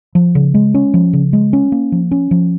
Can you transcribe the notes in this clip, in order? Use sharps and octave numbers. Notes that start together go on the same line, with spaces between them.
F3
C#3
G#3
C#4
F3
C#3
G#3
C#4
A#3
F3
C#4
F3